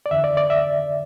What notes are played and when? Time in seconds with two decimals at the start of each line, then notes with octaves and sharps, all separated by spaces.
0.06 D5
0.11 E2 D3 E5
0.24 D5
0.37 D5
0.50 E5